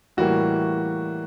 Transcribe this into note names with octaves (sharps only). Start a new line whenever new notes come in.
A2 E3 G3 A#3 F#4